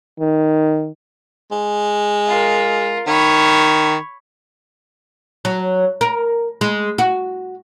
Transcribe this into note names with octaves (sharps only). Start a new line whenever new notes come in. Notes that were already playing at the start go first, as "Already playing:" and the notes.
D#3
G#3
F4 A#4
D#3 C#5 B5
F#3
A#4
G#3
F#4